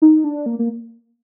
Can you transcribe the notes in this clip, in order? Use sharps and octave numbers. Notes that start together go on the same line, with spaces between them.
D#4
D4
A#3
A#3